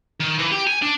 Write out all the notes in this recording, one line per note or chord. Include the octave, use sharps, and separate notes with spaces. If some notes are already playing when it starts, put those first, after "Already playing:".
D#3
E3
G4
G#5
D4